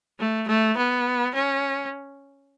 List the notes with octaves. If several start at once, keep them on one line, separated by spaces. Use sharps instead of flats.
A3
A3
B3
C#4